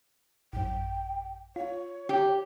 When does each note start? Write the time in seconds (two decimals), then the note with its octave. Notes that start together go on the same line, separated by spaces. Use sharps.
0.53 A1 F#2 G5
1.56 F4 C#5
2.09 G4